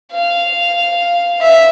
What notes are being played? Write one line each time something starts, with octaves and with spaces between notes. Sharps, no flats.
F5
E5